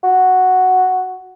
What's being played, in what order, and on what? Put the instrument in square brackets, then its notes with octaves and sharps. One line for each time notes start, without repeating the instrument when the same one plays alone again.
[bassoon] F#4